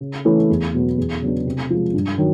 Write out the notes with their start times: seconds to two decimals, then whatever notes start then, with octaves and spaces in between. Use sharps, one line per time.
0.01 C#3
0.25 E3 A3 C#4 E4
0.49 E2
0.74 B2 F#3 B3
0.97 E2
1.21 C#3 F#3 B3 D4
1.46 C3
1.70 F3 G#3
1.94 G2
2.18 D#3 F#3